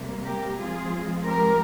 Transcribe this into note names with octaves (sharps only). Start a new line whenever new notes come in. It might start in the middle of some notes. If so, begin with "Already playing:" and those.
Already playing: C3 G3 A#3
G4 A#4
G#2 F3 G#3 C4 F4 G#4
G4 A#4